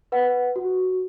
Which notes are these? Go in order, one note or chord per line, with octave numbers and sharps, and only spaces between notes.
B4 F#5
F#4